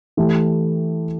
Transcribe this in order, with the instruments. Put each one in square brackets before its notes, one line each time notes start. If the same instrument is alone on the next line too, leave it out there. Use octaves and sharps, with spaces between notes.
[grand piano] E3 A3 E4 G4